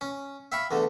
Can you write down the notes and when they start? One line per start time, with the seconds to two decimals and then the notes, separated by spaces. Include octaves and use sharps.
0.01 C#4
0.52 E5 F5 G5 B5 C#6
0.71 E2 D3 A3